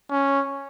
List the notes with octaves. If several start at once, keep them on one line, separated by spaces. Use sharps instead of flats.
C#4